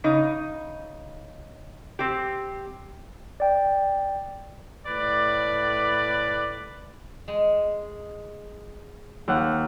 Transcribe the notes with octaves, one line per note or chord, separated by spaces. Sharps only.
C#3 D#4
C4 G4
D5 G5
A2 B4 D5
G#3
D#2 F#5